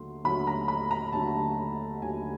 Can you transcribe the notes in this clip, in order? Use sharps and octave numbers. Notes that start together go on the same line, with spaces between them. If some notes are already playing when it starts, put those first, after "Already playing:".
Already playing: D#2 D3 F#3 A3 C6
D#2 D3 F#3 A3 B5
A#5
B5
A#5
D#2 D3 F#3 A3 A5
D#2 D3 F#3 A3 G#5